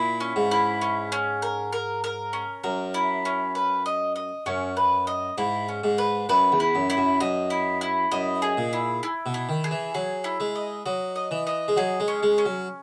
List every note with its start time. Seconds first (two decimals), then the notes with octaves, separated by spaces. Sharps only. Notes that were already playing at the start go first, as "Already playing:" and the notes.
Already playing: A#2 E4
0.20 C#4
0.36 G#2
0.51 E4
0.81 C#4
1.12 C#4
1.42 A#4
1.73 A#4
2.04 A#4
2.33 C#4
2.64 F#2 A#4
2.94 E4
3.25 C#4
3.55 B4
3.86 D#5
4.16 D#5
4.46 F#2 C#4
4.77 B4
5.07 D#5
5.38 G#2 E4
5.68 C#4
5.84 G#2
5.98 B4
6.29 F#2 B4
6.52 E2
6.60 E4
6.75 F#2
6.90 E4
6.97 F#2
7.20 F#2 D#5
7.50 E4
7.81 E4
8.12 F#2 D#5
8.42 G#4
8.57 A#2
8.73 E4
9.03 E4
9.26 B2
9.34 E4
9.49 D#3
9.64 G#4
9.71 E3
9.94 F#3 G#4
10.24 E4
10.40 G#3
10.55 D#5
10.86 F#3 D#5
11.16 D#5
11.31 E3
11.47 D#5
11.68 G#3
11.76 F#3 G#4
12.00 G#3
12.08 C#4
12.23 G#3
12.38 C#4
12.46 F#3